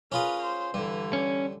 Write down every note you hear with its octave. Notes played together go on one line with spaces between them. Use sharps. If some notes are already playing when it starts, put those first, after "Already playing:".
C#4 F4 G#4 A#4 B4
C5
G2 D3 E3
C#4